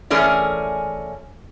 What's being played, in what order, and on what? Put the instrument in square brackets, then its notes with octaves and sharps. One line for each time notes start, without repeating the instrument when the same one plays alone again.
[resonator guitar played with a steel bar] E3 A3 C#4 G#4 A#4 D5